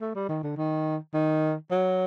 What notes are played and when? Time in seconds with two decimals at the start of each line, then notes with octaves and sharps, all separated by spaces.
0.01 A3
0.15 G3
0.29 D#3
0.43 D3
0.57 D#3
1.14 D#3
1.71 F#3